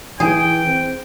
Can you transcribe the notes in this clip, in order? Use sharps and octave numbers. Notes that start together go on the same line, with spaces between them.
E3 G#4 G5
C4